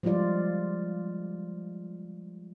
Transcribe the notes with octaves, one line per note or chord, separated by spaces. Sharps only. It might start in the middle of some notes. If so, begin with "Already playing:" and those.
F3 G3 G#3 F4 D5